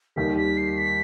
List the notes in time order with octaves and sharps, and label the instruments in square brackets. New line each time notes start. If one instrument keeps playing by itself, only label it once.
[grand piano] D#2 D#3 G3 [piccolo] B6
[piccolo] B6
C7
B6